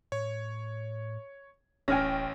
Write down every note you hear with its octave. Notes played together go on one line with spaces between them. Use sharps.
A2 C#5
D1 A1 C#4 G5 G#5 F6 A#6